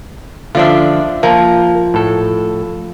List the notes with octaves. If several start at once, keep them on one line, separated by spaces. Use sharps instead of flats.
D3 F3 D4 F4 D5 E5
F3 A#3 A#4
A2 A4